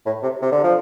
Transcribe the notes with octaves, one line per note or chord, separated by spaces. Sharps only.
A2
C3
C3
D3
F3